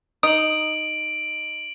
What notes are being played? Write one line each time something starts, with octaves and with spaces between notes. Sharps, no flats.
D#4 D#6 D7 F#7